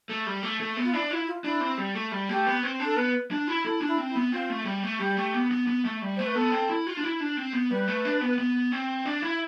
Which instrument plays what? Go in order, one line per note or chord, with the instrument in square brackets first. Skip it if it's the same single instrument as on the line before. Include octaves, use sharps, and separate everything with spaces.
[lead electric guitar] A3
G3
A3
A3
B3
[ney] F4
[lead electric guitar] D4 [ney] E4
[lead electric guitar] E4 [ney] F4
[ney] F4
[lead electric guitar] D4 [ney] E4
[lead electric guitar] C4
G3
A3
G3
[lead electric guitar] A3 [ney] G4
[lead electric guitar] B3
C4
D4
[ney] A4
[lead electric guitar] B3 [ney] B4
[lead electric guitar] D4
E4
[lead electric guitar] E4 [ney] A4
[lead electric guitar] D4
[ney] E4
[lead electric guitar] C4
[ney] E4
[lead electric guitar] B3
[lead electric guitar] C4 [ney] F4
[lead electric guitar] A3
G3
A3
[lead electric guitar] G3 [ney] G4
[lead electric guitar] A3
B3
B3
B3
A3
G3
[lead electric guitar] A3 [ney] C5
[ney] B4
[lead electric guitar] B3 [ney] A4
[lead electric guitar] C4
E4
F4
D4
E4
D4
C4
B3
[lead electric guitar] G3 [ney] B4
[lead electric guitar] A3
D4
B3
B3
C4
D4
E4